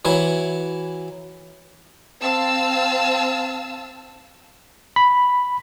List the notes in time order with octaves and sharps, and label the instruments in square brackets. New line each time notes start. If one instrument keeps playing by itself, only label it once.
[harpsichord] E3 F#3 E4
[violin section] C4 F5 A5 E6
[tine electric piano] B5